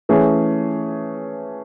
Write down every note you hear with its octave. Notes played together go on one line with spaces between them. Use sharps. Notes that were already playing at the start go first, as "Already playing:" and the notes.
E3 A3 C#4 G#4